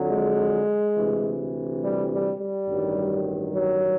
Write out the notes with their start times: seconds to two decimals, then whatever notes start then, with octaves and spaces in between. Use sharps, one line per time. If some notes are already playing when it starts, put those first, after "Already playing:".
Already playing: F2 D3 F#3
0.10 G#3
0.96 D2 C3 E3
1.82 G3
2.11 G3
2.39 G3
2.68 A1 G2 D#3 F#3
3.54 F#3